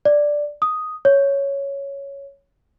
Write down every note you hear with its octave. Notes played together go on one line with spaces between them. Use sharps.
D5
D#6
C#5